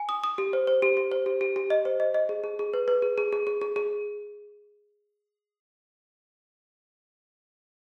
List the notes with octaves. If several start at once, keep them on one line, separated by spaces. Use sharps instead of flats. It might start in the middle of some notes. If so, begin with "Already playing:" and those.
Already playing: G#5
D#6
D#6
G4
C5
C5
G4
G4
C5
G4
G4
G4
D#5
C5
D#5
D#5
G#4
G#4
G#4
B4
B4
G#4
G#4
G#4
G#4
G#4
G#4